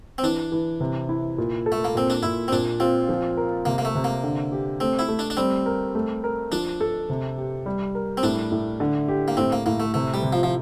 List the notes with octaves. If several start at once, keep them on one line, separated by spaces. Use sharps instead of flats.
C4
E3 D4
E3
C3
E4
A#2
A4
A3
A#3
A#2 C4
D4
A#2 E4
C4
A#2 D4
C4 F4
F3
A#4
C3 A#3
A#3
A3
C3
A#3
D3
G4
A3 C4
E4
A3
D4
D4
G3 C4
A#4
A3
A#4
F3 D4
A4
C3
G4
G3
A#4
C4
A2 D4
A2
D3
G4
A#3
A2 C4
A#3
A2 A#3
A3
C3 A3
G3
C3
F3
F3